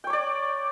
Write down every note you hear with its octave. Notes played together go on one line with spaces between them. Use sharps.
C#5 D5 G5 D6